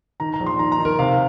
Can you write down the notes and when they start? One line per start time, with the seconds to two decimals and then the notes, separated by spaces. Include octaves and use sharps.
0.20 D#3 A#5
0.34 A#5
0.40 A#1
0.46 C6
0.59 D#3 A#5
0.72 A#5
0.79 D#3
0.85 A#4
0.99 C3 F5